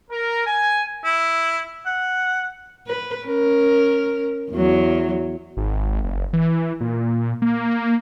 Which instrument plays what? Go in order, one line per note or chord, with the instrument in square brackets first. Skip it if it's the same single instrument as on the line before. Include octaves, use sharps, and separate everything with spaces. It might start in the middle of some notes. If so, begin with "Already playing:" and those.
[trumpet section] A#4
G#5
[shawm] E4
F#5
[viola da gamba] B4
C#4 A#4
E2 F#3
[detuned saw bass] G#1
F#1
E3
A#2
A#3